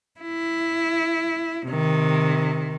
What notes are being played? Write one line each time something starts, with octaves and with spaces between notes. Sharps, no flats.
E4
C3 D#3